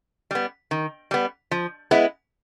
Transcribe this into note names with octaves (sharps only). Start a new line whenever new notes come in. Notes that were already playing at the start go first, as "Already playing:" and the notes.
G3 B3
D#3
G3 B3
F3
G#3 B3 E4